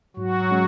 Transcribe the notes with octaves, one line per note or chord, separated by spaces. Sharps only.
G#2 F#3 F#4
G#3 C#4